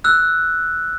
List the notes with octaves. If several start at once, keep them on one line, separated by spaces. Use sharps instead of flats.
E6 F#6